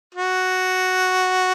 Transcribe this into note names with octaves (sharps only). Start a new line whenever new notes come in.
F#4